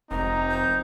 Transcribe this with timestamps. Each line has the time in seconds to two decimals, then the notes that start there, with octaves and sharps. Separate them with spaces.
0.11 F1 C4 D#4 A#5
0.50 G6